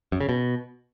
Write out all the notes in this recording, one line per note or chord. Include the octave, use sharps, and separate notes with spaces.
F#2
C#3
B2